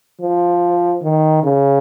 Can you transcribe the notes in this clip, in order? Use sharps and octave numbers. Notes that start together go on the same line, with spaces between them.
F3
D#3
C#3